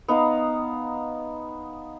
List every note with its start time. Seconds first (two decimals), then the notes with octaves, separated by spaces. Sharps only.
0.08 B3 D#4 F5 A#5